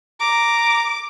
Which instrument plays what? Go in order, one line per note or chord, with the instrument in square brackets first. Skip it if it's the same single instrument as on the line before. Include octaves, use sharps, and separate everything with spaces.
[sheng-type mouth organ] A#5 [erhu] D6